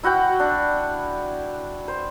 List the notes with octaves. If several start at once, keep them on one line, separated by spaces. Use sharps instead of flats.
E4 F#4 F#5 G5
D4
C5